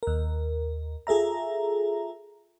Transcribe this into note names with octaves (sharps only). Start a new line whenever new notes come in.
D#2 A#4
F4 G#4 A4 E5 A#5